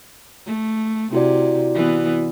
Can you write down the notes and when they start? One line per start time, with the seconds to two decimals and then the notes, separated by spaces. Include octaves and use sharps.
0.46 A3
1.13 C3 E4 F#4 D5
1.75 E3 B3